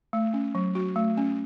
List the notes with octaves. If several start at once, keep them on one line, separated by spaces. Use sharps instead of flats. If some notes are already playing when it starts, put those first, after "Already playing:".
A3
C#4
F#3
F#4
A3
C#4